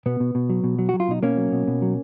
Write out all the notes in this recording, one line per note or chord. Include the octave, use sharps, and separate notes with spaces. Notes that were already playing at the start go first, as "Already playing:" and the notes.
B2 B3
B2
B2
F#3
B2
F#3
F#3 F#4
F4
B2 D#4
B2 A#3 C#4
F#3
B2
B2
F#3